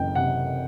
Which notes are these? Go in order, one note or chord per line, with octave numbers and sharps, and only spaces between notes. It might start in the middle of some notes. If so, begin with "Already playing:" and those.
Already playing: F#1 E3 G5
C3 F#5